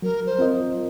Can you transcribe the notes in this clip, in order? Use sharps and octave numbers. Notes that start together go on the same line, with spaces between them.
F#3 A#4
C5
C4 F4 A#4 D#5